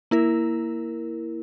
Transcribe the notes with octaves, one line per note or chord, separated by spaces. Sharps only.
A#3 E4 A#4